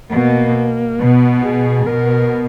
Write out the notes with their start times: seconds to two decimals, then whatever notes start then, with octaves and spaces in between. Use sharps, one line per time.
0.13 B2 A#3
1.00 B2 B3
1.43 G#4
1.86 B2 A#4